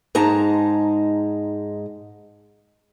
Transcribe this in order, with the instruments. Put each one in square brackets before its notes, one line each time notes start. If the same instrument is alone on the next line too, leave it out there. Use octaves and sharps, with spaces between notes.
[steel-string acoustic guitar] G#2 G#3 D#4 A5 A#5